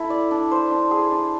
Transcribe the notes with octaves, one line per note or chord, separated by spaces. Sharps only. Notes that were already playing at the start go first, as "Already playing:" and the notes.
Already playing: E4 A4
D5
D4
C5
D4
G#4
D4